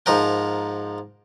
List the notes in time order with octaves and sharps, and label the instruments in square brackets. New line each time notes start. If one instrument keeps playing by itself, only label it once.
[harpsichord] G#2 F3 A#4 G5